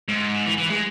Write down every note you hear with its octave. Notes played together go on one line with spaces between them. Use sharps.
G#2
E3
E3
G#3